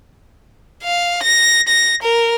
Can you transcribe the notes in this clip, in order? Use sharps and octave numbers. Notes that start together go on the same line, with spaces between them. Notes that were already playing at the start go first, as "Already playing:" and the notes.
F5
A#6
A#6
A#4